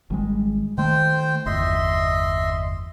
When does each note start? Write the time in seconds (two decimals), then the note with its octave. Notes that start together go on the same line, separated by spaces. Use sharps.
0.10 G#1 G3 G#3
0.78 D#3 A3 C5 G5
1.46 G1 E2 D#5 E5 C6